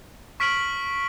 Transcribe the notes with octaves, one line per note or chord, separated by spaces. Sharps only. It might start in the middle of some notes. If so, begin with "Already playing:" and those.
C#6 F6 B6 D7 F#7